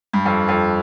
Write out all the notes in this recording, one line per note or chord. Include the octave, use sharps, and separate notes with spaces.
G2
F2
F2